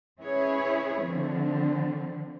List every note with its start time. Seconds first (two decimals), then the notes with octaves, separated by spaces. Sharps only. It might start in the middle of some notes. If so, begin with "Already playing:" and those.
0.20 C#4 E4 G#4 B4 C#5
1.02 D3 D#3 F3 C4